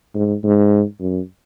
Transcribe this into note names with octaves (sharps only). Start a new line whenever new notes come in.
G#2
G#2
F#2